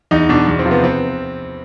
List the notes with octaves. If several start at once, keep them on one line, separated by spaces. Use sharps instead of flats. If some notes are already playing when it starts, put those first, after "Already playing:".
E2 D#4
B2 D4
E2
C4
C3 F3
B3
C4